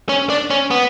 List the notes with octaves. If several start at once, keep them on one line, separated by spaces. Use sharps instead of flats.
C#4
D4
C#4
B3